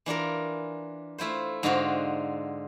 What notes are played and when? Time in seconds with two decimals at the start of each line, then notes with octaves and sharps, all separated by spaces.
0.06 E3 D4 F4 A#4
1.18 A3 E4 F4 C5
1.63 G#2 D3 D4 D#4 F4 F#4